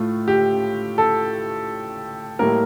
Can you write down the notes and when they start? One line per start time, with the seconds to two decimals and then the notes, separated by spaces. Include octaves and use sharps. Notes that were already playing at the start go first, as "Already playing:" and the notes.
Already playing: A2 A3 F4
0.28 G4
0.98 A4
2.39 A2 G3 A#3 A#4